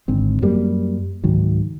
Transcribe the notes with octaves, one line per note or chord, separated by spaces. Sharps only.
G#1 G#2 D3 C4
F#2 F#3 G3 A#3
C#2 G#2 D#3 F#3